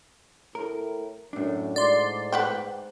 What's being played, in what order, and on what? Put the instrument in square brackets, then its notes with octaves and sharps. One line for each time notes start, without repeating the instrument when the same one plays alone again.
[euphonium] A2 [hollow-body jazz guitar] A#4
[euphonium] F#2 [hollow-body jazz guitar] A2 D4
[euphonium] G#2 [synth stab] D5 C6
[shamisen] B4 F#5 G5